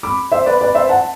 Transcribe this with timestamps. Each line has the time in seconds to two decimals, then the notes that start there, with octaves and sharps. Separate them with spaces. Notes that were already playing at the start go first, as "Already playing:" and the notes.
0.03 B5 D6
0.32 C5 E5
0.46 B4 D5
0.61 B4 D5
0.75 C5 E5
0.89 F#5 A5